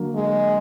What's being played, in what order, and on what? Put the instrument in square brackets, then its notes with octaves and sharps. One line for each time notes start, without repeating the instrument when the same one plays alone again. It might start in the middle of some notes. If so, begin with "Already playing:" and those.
Already playing: [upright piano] D3 F#3 A#3
[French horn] G#3